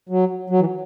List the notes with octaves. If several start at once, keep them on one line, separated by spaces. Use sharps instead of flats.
F#3
F#3
E3